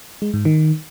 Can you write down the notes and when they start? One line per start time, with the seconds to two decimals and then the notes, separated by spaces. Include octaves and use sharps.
0.22 G#3
0.34 G#2
0.45 D#3